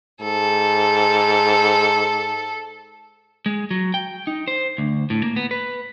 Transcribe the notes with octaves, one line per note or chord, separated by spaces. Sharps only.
G#2 A4
G#3
F#3
G5
D#4
C5
D2
A2
A#3
B3
B4